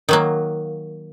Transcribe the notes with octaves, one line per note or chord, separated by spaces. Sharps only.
D#3 F#3 A#3